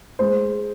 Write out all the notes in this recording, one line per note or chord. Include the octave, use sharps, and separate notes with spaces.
G#3 C5